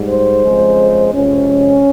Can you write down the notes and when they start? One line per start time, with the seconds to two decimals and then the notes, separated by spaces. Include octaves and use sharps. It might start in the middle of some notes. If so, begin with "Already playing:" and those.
Already playing: G#2 G3
0.08 C5
0.43 F2 C#3 G#3
1.12 F2 C3 F3 G#3 C#4